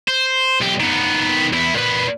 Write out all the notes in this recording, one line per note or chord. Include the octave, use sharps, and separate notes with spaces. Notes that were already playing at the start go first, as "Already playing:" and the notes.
C5
B1 G4
D#3 B3
E2 E4
A#2 B4